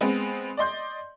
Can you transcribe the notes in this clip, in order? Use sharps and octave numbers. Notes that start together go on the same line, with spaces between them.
G#3 B3 C4
D5 D#5 C6 G6